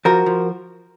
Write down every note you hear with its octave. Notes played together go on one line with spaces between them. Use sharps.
F3 F#4 A#4
F3